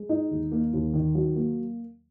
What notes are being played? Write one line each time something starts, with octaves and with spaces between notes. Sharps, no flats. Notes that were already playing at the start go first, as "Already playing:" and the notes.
Already playing: G#3
D#4
D#2
A#3
D#2
D#3
F#3
A#3